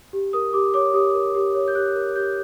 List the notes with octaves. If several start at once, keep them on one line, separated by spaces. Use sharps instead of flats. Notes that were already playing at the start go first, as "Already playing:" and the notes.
G4
A#4 D#6
G4 D6
C#5 D6
G4 D#6
A#4
G4
C#5
G6
G4 F#6
A#4
G4 G6